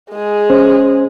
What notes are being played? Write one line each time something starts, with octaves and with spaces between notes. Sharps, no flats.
G#3 G#4
C#4 C5